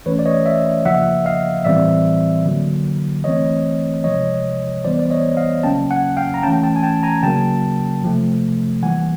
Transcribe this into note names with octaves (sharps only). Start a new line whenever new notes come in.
E3 A3 C#4 B4 C#5
D5
C#5 D#5
D5 E5
C#3 F3 A#3 E5 F#5
D#5 F5
A2 E3 G3 C4 D5 E5
D3 F#3 A#3
E3 A3 C4 C#5 D#5
C3 F3 G#3 C#5 D#5
E3 G3 B3 C5 D5
D5
C#5 D#5
D#5 F5
C#3 F#3 A#3 C#4 G5 A5
F#5 G#5
F5 G5
A#5
E3 A3 C#4 G5 A5
G5 A5
G#5
G5 A5
G#5 A#5
C#3 F#3 A#3 G5 A5
C3 F3 A3
E3 G3 A#3 F#5 G#5